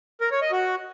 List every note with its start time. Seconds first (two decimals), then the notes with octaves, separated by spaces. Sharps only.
0.21 A#4
0.31 C#5
0.42 D#5
0.52 F#4